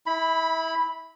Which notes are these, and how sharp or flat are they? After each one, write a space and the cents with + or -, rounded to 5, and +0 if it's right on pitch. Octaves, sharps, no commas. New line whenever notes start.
E4 -25 B5 +0